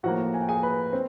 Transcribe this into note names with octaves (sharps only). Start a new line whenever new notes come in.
A2 F3 A#3 F#4 F#5
G#5
G5
G#4 G#5
B4 B5
C4